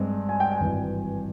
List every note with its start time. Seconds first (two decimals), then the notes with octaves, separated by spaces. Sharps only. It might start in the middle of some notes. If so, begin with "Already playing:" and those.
Already playing: G2 G#3 C4
0.29 G#5
0.40 G5
0.52 G#5
0.60 G#1 G2 E3